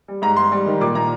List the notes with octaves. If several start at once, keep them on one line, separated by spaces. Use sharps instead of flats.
G3
G#2 A#5
G#2 C6
G3
D#3
A#2 D6
A#2 A#5